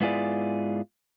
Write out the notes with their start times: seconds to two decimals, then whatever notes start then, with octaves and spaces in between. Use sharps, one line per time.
0.01 G#2 B3 E4 F4 G#4 D5